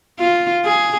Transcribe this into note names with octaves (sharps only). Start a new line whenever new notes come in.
F4
G#4